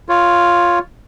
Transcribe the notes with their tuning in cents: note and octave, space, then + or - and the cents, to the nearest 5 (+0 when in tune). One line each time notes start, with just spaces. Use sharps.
F4 +0 C#5 +0